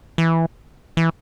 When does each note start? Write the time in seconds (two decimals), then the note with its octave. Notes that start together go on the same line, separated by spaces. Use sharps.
0.18 E3
0.97 E3